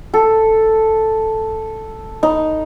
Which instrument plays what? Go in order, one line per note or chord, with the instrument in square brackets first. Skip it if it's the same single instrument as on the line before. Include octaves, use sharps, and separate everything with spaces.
[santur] A4
D#4